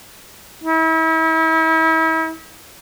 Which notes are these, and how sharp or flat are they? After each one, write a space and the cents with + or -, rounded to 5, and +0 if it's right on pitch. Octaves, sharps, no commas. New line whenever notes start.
E4 -40